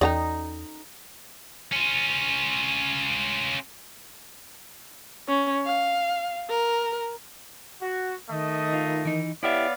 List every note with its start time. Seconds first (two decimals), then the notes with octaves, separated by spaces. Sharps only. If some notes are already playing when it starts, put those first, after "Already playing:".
0.01 E2 C#4 D#4 F#4 A4 D5 F#5 A#5
1.72 C#4 F4
5.28 C#4
5.65 F5
6.49 A#4
7.82 F#4
8.29 D#3 A3 D#5
8.73 D#4 F4
9.05 E3 D#4
9.43 B3 E4 G4 C#5 D5 E5 F5